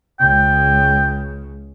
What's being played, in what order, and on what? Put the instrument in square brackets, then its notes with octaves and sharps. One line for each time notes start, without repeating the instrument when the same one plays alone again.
[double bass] C#2 C#3 [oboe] G5